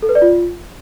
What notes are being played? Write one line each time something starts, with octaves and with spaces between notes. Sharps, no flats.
A4
B4
D5
F4